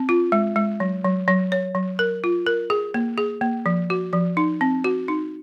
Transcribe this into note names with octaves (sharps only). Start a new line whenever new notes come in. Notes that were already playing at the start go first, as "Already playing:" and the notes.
Already playing: C4
F4
G#3
G#3
F#3
F#3
F#3
C#5
F#3
A#4
F4
A#4
G#4
A#3
G#4
A#3
F3
F#4
F3
D#4
C4
F#4
D#4